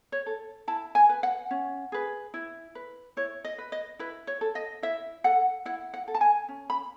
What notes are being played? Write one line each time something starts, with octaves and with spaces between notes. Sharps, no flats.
C#5
A4
E4 A5
G#5
B4
F#5
C#4
G#4 B4
E4
B4
E4 C#5
D#5
B4
D#5
E4 B4
C#5
A4
D#5
E4 E5
A4 F#5
E4 F#5
F#5
A4
A5
G#5
C#4
B5